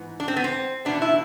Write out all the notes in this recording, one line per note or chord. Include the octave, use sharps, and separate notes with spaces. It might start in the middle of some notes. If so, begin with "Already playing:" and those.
Already playing: G#2 E3 B3
D4
C4
B3
C4
E2 B2 B3 D4
E4